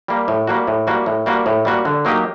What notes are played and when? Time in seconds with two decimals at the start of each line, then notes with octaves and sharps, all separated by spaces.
0.08 G3 A#3
0.28 A2
0.47 G3 A#3 F#4
0.67 A2
0.87 G3 A#3 F#4
1.06 A2
1.26 G3 A#3 F#4
1.46 A2
1.65 G3 A#3 F#4
1.85 D3
2.05 F#3 A#3 D#4 G4